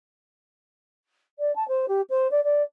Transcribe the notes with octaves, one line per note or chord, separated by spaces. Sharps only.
D5
A5
C5
G4
C5
D5
D5